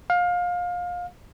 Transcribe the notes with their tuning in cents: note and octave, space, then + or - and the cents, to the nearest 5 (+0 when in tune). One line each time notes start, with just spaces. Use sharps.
F5 +25